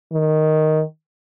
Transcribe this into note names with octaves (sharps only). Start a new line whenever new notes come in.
D#3